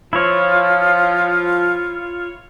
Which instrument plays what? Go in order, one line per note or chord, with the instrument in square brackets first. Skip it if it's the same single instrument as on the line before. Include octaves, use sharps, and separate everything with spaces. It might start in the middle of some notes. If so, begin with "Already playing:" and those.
[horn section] F3 [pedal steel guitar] E4 C#5 [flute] F4